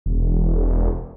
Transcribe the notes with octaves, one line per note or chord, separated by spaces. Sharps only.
E1